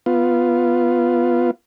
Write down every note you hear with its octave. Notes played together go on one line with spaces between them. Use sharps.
B3 F4